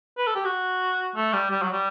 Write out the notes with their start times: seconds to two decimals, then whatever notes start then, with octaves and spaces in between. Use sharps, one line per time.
0.18 B4
0.27 A4
0.36 G4
0.45 F#4
1.16 A3
1.33 G3
1.50 G3
1.62 F#3
1.72 G3